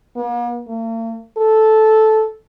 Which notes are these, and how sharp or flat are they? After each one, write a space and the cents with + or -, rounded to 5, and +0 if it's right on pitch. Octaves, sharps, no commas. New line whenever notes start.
A#3 +45
A#3 -45
A4 -10